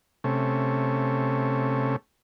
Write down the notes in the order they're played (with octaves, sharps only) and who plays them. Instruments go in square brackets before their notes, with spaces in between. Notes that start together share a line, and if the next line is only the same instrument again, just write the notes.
[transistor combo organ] C3 A3 C#4